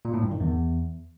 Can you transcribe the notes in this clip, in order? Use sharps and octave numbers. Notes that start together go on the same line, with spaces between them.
A#2
A2
G2
D#3
E2